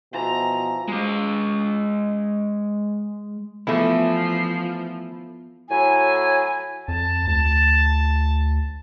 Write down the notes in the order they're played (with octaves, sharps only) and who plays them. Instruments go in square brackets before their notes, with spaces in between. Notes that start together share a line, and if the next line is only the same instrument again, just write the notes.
[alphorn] B2 [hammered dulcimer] E3 F3 [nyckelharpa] A#5
[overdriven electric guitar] G#3 F5
[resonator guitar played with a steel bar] E3 A3 [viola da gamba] F3 [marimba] B3
[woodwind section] A2 F#3 E4 G#5
[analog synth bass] F2 [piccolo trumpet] A5
[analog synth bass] D2 [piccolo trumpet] A5